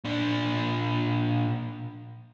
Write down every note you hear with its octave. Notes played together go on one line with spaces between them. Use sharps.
A#2 D4